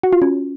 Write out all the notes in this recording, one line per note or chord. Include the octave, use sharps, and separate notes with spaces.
F#4
F4
C#4